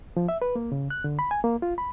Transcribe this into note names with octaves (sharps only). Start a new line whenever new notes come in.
F3
E5
B4
A#3
C#3
F#6
D3
B5
G#5
A#3
F4
B5